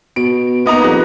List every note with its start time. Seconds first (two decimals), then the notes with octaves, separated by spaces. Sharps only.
0.16 B2 D7
0.66 A#3 B3 D#4 B4 D#5 A#5
0.84 F2 G3 F#6